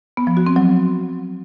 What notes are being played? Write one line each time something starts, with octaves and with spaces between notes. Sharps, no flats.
B3
F3
F#4
C4
F#3